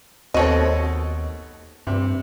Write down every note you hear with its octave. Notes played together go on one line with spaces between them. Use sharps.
D#2 B2 C4 A4 C#5 D#5
G2 C3